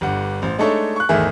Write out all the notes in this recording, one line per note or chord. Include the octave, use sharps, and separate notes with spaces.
G1 G2 D3 F#5
A1 C5
G#3 A3 D4 D#4 A4 C#5
C#6 F#6
G#1 E2 D#3 A3 G#4 E5